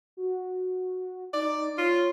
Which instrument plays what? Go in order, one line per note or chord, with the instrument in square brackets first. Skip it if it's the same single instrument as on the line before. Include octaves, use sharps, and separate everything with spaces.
[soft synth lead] F#4
[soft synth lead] D#4 [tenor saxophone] D5
[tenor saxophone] F4 [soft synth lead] C#5